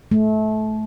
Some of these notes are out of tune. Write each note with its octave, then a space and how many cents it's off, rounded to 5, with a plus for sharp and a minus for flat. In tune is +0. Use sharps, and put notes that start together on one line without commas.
A3 -25